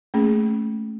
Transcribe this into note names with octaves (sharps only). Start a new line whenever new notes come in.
A3 A#3 C#4 G#4